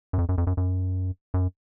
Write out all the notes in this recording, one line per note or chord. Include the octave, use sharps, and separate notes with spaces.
F#2
F2
F#2
F2
F#2
F#2
F#2